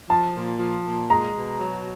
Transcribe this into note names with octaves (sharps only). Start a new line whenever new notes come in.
F3 A5
A#2
F3
A#2
G#3 A#5
B2
F#3